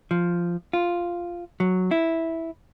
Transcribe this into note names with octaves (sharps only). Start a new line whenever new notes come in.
F3
F4
F#3
E4